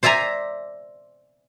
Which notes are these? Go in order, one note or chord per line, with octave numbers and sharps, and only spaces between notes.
C5 D5 E5 G#5 A#5